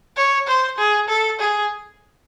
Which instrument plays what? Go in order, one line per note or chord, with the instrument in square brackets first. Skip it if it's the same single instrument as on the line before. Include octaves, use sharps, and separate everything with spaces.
[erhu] C#5
C5
G#4
A4
G#4